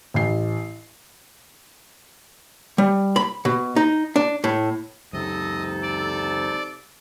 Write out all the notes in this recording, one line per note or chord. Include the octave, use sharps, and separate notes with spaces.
A1 C7
G3
B5
B2
D#4
D4
A2
C#2 F#2 C3 D#4 A4 D#5
D5